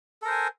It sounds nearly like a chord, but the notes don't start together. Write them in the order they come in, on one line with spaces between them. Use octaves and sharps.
A4 A#4 C5 G#5